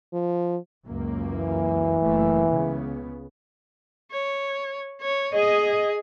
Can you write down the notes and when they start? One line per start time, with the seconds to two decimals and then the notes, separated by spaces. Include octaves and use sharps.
0.13 F3
0.86 C#2 F#2 A#3
1.29 E3
2.01 F#1 A3 A#3
2.49 C#2 C#3 B3
4.12 C#5
5.01 C#5
5.34 G#4 D#5